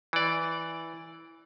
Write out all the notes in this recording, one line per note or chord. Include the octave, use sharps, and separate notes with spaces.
E3 D5